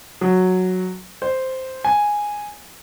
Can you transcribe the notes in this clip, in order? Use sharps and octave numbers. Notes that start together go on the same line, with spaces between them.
F#3
C5
G#5